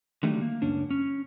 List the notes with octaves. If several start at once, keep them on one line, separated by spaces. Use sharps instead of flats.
D3 D#3 F#3 G3 A3
A#3
C#2 F#2 C#4 D4
C#4